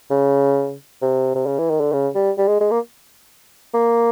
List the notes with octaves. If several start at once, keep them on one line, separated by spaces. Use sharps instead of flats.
C#3
C3
C3
C#3
E3
D#3
D3
C#3
G3
G3
G#3
G#3
A#3
A#3